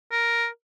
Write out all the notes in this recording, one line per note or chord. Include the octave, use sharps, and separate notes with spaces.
A#4